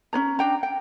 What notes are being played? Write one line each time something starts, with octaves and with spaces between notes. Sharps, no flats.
C#4 D4 C#5 A#5
D4 G5 A#5
G5